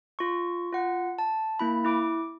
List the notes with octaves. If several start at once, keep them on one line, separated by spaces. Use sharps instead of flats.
F4 C#6
F4 F#5
A5
A#3 E4 B5
E4 D6 D7